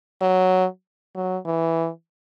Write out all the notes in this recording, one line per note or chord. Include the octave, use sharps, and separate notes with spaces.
F#3
F#3
E3